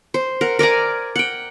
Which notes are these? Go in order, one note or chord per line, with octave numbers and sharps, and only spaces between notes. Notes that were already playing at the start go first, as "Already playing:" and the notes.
C5
A#4 F#5
A#4 D5 G#5 A#5
F#5 G5